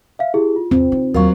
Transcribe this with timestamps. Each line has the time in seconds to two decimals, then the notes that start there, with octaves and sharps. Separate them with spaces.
0.19 E5 F5
0.34 E4 G4 G#4
0.56 F4
0.71 E2 C4
0.92 D#4
1.14 D#2 F#3 F4 A#4 F5 C#6